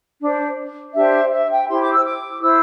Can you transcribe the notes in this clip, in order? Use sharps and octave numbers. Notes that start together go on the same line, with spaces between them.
D4 C5
D4 G4 C5 E5
E5
G5
E4 G4 C5 C6
D6
E6
D6
E4 C5 E6